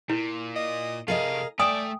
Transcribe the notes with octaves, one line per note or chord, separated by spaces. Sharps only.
A#2 E4
D#5
C3 A3 G#4 A#4 D#5 F5
A3 D5 E5 G5 G#5 D#6